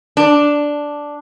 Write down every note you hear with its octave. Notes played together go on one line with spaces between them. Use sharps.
D4